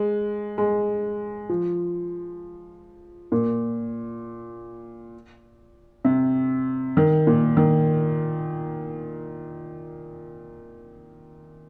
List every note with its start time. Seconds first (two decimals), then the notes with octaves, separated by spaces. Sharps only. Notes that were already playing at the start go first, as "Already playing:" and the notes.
Already playing: G#3
0.58 G#3
1.49 F3
3.32 A#2
6.05 C3
6.97 D#3
7.27 A#2
7.57 D#3